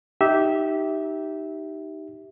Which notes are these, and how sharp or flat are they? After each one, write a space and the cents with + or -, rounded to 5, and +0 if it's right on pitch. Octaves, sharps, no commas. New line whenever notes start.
D#4 +0 G4 -15 E5 -15